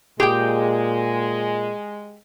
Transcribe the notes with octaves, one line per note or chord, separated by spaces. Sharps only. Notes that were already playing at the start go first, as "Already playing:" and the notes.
A#2 G#3 G4 G#4 G5